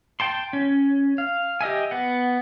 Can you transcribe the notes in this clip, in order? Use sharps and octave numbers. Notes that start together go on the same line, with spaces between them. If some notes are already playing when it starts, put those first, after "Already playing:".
G5 A5 C6
C#4
F5
G4 D#5 E5 G#5
B3 F#5